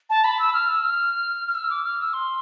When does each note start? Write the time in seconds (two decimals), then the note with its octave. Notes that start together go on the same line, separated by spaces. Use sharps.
0.10 A5
0.24 B5
0.39 E6
0.53 F6
0.68 E6
0.83 F6
1.48 F6
1.55 E6
1.70 D6
1.85 F6
1.99 E6
2.13 C6